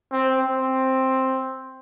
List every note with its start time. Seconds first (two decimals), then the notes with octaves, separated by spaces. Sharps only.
0.12 C4
0.43 C4